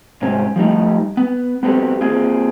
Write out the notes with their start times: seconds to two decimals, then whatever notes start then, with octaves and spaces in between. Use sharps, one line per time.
0.22 G#2 C3 C4 C#4
0.56 F3 G3 A3 D#4
1.17 B3
1.63 B3 C4 F#4 G4 A4
2.01 A#3 C4 F4 G#4